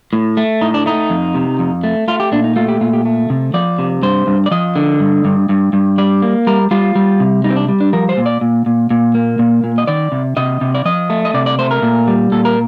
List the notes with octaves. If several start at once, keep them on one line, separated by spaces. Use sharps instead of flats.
A2
A3
A2 D#4
D4
A3 D#4
F2
C3
F2
A3
A3 F4
G4
A#2 D4
D#4
A3 F4
G4
A#2 F4
G4
A3
C3
F3 D5
C3
G2 C5
G2
D5
F3 D#5
D3
G2
G2
G2
G2
G3 D5
A#3
G3 A#4
G3 F4
G3
C3
G3 D#4
C4
D4
G3
D4
F3 A#4
C5
A#2
D5
A#2
A#2
A#2
A#3
A#2
A#2
D#5
D#3 D5
C3
C3 D#5
C3
D5
F3 D#5
A3
D#5
C3 D5
D5
A3 C5
A#4
A#2
G3
A#2 A4
A#4